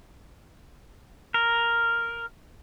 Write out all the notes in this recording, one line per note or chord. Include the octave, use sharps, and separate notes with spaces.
A#4